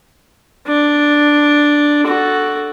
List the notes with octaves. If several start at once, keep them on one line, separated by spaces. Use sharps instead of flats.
D4
F#4 A4